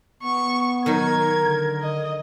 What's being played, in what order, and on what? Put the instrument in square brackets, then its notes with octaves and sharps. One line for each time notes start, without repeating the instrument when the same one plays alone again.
[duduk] B3 [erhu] C#6
[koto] D#3 F#3 D#4 [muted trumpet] A#4 [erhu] G#6
[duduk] D3
[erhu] D#5